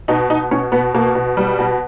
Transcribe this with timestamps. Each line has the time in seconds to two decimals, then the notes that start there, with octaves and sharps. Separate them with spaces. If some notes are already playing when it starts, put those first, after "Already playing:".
0.08 B2 D#4
0.30 B2 D#4
0.51 B2 C#4
0.72 B2 B3
0.94 B2 A#3
1.15 B2
1.37 B2 G3
1.59 B2